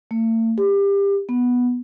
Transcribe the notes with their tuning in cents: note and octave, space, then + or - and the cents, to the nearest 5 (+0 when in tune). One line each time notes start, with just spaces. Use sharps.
A3 +45
G4 +25
B3 -5